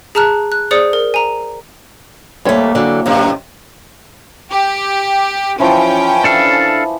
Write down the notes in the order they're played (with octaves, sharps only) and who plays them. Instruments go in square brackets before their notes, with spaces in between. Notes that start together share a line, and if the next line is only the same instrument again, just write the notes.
[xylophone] G#4 A5 A#5 F6 F#6
F#6
G#4 C5 D5 D#6 C#7
A#4
G#5 A#5
[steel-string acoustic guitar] D#2 A3 [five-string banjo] G3 C4 C#5 [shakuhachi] A#3
[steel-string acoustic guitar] D3 E3 F#3
[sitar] F#2 C3 [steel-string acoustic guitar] A2 D#3
[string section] G4
[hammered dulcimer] E3 F3 [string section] C#4 G5
[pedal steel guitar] D4 A4 F5